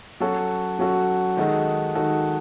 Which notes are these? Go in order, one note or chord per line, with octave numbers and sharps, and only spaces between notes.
F#3 C#4 F#4 A4
F#3 C#4 F#4 A4
D#3 G#3 D#4 F#4 A4
D#3 G#3 D#4 F#4 A4